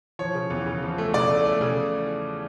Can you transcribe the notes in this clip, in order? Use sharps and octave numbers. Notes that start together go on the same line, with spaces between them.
F3 C#5
C#3
E2
C#3
F3
A3
C#3 D5
A3
A3
C#3